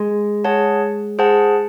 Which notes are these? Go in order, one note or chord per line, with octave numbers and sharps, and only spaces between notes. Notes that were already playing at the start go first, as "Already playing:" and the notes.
Already playing: G#3
G#4 C#5 F#5 A5
G#4 C5 F#5 A5